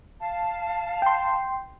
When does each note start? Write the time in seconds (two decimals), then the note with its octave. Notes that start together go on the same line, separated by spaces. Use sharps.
0.20 F5 A5
1.02 G5 C6